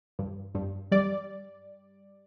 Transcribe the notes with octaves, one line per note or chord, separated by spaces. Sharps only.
G2
G2
G3 D5